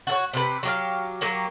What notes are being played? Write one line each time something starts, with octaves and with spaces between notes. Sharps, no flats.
F#4 A4 C#5
C3 G4 B4
F#3 G4 F5
F#3 A#3 G4